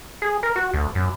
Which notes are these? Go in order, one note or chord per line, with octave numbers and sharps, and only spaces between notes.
G#4
A#4
F#4
D2
F#2